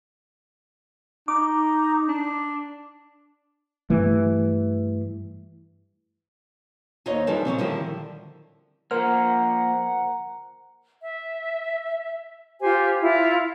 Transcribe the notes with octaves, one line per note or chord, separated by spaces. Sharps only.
D#4 D6
D4
G2 E3 A3
D#2 D#4 C5 C#5 D#5
F2 E3 F3 G3 D4 A4
A#2 C#3 F#3 C4
D3 D#3 F3 G3 E4
F3 A#3 A#4 C5 F#5 A#5 F6
E5
F4 G4 C5 G#5
E4 F4